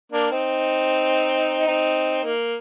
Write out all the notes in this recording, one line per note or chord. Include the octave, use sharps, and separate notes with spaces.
A#3 D4
C4 D#4
C4 D#4
A#3